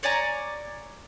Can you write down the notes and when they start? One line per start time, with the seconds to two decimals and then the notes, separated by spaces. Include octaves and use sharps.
0.03 C#5 D5 G#5 A#5